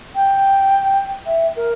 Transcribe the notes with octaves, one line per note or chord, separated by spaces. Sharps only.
G5
E5
A#4